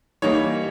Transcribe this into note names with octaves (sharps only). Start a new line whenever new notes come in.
E3 G3 A#3 D#4 C#5